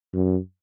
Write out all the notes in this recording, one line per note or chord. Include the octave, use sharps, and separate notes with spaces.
F#2